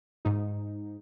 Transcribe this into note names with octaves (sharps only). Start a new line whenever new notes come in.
G#2 D#4